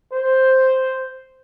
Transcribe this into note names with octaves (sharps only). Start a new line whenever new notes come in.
C5